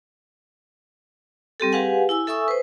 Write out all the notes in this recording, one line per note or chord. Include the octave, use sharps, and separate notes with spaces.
G3 C4 G4 A4
G4 G#4 B4 F5 F#5 G#5
E4 G#5 E6
A4 E5 G#5 C#6 D#6 E6
B4 C5